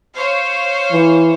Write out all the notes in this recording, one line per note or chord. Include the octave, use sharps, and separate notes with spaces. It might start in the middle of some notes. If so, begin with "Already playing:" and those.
C5 C#5 F5
E3